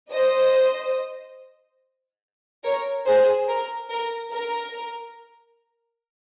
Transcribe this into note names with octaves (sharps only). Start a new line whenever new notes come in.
C5 D#5
A#4 C#5
G#4 C5
A#4
A#4
A#4